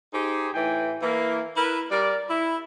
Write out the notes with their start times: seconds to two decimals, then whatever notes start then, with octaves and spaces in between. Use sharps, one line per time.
0.13 D#4 G4 G#4 C5
0.53 A2 E3 G5 G#5
1.02 E3 A#3
1.56 E4 A#4 B4
1.90 G3 A#4 D5
2.29 E4